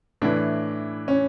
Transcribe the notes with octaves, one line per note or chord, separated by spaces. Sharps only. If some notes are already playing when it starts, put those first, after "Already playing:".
A2 E3 D4
C#4